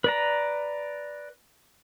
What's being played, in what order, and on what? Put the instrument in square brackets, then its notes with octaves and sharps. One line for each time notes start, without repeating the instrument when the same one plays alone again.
[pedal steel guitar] B4 D5 A#5